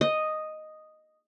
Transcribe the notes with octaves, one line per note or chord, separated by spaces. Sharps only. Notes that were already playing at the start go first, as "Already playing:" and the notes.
D#5